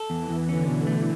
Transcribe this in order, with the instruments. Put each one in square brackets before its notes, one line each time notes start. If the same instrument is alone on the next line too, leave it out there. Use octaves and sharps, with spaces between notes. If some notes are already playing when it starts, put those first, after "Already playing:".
Already playing: [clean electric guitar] A4
[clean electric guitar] E2 [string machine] E3
[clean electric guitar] E2
[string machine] D3 [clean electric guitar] C#4
[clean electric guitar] B2
A3